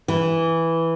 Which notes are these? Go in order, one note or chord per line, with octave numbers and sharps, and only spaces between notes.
E3